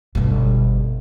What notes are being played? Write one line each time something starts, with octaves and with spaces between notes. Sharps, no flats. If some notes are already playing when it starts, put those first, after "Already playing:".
G1 B2